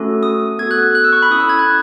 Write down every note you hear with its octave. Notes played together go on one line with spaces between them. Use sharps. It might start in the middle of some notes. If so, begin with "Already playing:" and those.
Already playing: A3 C#4 F#4 A4
D#6
B3 F#4 A4 G#6
F#6
F#6
E6
C#6
B5
C#4 E4 A4 D#6
E6
G#6
F#6